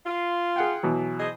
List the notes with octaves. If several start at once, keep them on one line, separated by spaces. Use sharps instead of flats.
F4
G#4 F#5 G5
B2 E3 F#3
G#4 C5 D#5